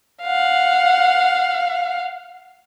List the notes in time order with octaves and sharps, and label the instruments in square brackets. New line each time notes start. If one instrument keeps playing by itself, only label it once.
[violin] F5 F#5